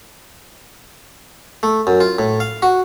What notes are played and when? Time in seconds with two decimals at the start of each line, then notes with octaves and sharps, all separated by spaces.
1.63 A3
1.87 F#2
2.00 F4
2.18 A2
2.40 F5
2.62 F#4